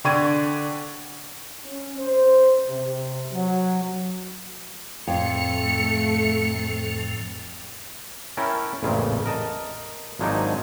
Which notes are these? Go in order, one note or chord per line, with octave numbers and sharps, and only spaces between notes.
D3 D4 G5 C#6 G#6 D#7
C#4
C5
C3
F#3
F2 A2 F3 A3 C#7
C#4 E4 A#4 G5 A5
A1 F2 A#2 C#3
A#4 D#5 A5
G#1 F3 F#3 D4 D#4 G#5